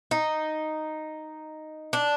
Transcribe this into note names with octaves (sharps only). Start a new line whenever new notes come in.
D#4
D4